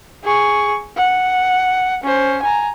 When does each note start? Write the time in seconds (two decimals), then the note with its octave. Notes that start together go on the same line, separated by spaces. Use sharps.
0.24 G#4 C#6
0.97 F#5
2.03 C#4 C5
2.42 G#5 A#5